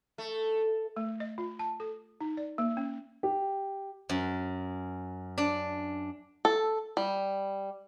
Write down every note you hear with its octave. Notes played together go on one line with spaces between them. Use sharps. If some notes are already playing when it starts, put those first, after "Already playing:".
A3
A3
D#5
F4
A5
A4
D#4
D5
A#3
C#4
G4
F#2
D4
A4
G3